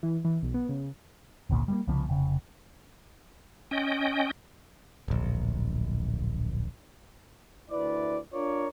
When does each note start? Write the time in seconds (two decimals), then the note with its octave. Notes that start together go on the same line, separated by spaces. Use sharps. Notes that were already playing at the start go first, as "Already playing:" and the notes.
0.03 E3
0.25 E3
0.43 B1
0.54 B3
0.69 C#3
1.50 G#1 D2 A#2 B3
1.68 G3 G#3 A#3
1.87 C2 C#3 F3 B3
2.09 F1 C#3
3.71 C#4 D#5 G5
5.08 D1 A#1
7.70 D2 E4 B4 D5
8.34 D4 F4 A#4 C#5 D5